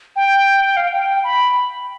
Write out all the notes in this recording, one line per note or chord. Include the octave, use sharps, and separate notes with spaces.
G5
F5
G5
B5